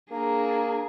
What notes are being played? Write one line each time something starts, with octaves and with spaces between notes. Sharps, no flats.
A#3 D4 G#4 A#5